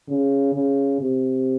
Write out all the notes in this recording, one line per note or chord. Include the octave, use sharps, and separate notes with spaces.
C#3
C#3
C3